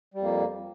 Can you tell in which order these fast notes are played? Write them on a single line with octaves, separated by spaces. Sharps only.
G3 F2 A#3